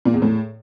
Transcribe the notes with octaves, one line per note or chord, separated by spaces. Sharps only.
A#2
E2
A2